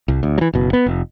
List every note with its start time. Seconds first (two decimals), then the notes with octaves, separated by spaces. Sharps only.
0.08 C2
0.23 D2
0.38 E3 F#3
0.53 F#1 B2
0.73 B3
0.86 F1